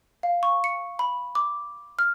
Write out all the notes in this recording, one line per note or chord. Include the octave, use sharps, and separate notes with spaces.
F5
C#6
C#7
B5
D6
F6